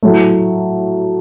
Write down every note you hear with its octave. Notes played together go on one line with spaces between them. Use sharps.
A2 F#3 A3